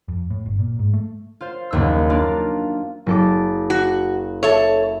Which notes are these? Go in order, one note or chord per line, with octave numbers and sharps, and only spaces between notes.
F2
A2
G1
A#2
G#2
A3
F4 C5
F#1 D#2 E6
A#3 D4 F4
F#1 A4 D6
F#4
A4 C#5 E5